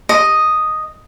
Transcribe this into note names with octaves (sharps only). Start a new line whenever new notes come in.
D#5